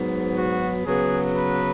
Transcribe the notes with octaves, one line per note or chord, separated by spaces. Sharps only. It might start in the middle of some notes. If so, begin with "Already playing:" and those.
Already playing: G#2 F#3 B3
F#4
C#3 F#3 B3 G#4
B4